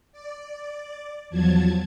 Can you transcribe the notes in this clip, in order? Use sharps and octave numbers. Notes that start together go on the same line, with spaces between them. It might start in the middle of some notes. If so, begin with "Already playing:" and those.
D5
E2 F3 F#3 A5 G#6